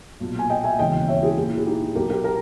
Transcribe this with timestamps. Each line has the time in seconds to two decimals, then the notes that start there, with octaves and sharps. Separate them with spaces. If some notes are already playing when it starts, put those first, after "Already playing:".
0.20 B1 A#2
0.39 G#5
0.50 D#5 G5
0.64 E5 G#5
0.79 E1 D#2 C#3 E3 D#5 G5
1.08 C#5 E5
1.23 E4 G#4
1.37 A#1 A#2 E4 G#4
1.57 E4 G#4
1.66 D#4 G4
1.95 B1 B2 G4 A#4
2.10 G4 A#4
2.24 G4 A#4